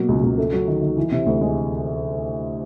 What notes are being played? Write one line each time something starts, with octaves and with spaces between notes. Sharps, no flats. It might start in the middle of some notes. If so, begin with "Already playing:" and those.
Already playing: B2 F#3 A#3
C#2
C#2
A3
F#3
D#3
D#3
E3
C3
D2
G#3